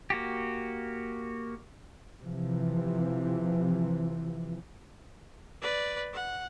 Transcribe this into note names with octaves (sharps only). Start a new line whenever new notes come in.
A#3 F#4 G4
C3 E3 F3
B4 D5
F#5